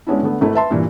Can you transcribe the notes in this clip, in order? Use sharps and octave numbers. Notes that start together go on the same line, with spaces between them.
G#3 B3 C#4 D4 E4
D3 A3 B3
G#1 A3 E4
B4 E5 A5 C6
G2 A#2 E3